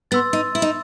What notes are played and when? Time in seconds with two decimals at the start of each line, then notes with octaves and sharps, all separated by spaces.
0.11 B3 C6 E6 A6
0.33 D#4
0.55 E4
0.62 D#4